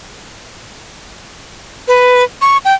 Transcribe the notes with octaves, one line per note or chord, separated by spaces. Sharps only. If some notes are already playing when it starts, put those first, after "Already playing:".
B4
C#6
G5